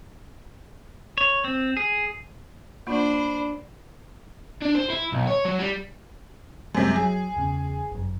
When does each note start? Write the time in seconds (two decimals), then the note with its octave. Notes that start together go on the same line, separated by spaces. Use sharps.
1.18 C#5
1.44 C4
1.77 G#4
2.87 A#3 D4 F4 C5 B5
4.62 D4
4.75 C5
4.90 E4
5.12 B1
5.27 C#5
5.45 F#3
5.59 G3
6.75 F#2 C3 G3 G#3 A#3
6.96 F#3 G#4
7.36 E2 C#3
7.92 G1 F#2